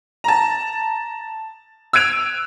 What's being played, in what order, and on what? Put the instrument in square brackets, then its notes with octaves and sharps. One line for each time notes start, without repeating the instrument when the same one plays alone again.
[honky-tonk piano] A5 A#5
E6 F#6 G#6 D7 F7